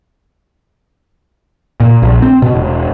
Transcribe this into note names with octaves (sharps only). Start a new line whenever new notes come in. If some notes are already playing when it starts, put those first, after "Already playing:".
A#2
A#1
C4
B2
E1